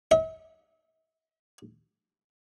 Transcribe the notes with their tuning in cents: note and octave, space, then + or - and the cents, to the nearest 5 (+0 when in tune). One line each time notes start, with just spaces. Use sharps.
E5 -45